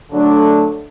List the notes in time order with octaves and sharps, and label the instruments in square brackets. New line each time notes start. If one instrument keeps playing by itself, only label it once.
[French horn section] D3 F#3 A3 D4